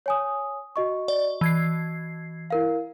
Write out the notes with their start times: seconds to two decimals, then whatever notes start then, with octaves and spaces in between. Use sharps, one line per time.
0.06 C#5 G#5 D#6
0.76 F#4 D#5 C#6
1.08 D5
1.41 E3 G#6 C7
2.50 E4 A#4 F5